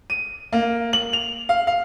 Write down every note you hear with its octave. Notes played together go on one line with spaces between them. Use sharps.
D#7
A#3
F#7
F7
F5
F5